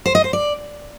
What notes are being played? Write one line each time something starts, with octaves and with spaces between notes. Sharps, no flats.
C5
D#5
C5
D5